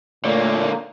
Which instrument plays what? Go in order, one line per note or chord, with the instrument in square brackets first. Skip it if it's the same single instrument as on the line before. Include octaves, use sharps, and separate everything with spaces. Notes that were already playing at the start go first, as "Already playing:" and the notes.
[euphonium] A#2 [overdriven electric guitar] D3 A#3 [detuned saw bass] A3 [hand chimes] C#5 D5